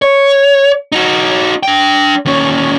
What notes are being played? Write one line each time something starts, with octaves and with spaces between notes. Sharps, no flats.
C#5
D#4 F#4
D4 G5
D#2 C#4